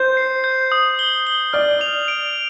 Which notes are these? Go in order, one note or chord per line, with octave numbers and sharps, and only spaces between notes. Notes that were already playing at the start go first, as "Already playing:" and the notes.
Already playing: C5 G6
C7
G6
D#6
G7
G7
D5 F6
F7
D7